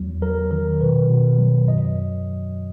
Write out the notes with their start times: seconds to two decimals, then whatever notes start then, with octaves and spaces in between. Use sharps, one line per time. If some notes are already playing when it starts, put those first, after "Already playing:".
Already playing: E2 F#3
0.22 F#3 A#4
0.51 D#3 A#4
0.81 B2 B4
1.10 B2
1.38 F#3
1.68 F#2 D#5